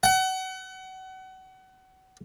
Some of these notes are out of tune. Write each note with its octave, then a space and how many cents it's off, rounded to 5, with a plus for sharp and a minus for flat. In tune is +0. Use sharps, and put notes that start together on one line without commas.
F#5 +30